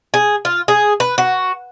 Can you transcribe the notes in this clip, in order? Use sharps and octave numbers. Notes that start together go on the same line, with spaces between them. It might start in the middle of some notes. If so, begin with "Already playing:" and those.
G#4
F4
G#4
B4
F#4